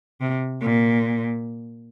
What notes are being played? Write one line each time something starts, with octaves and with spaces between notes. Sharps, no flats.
C3
A#2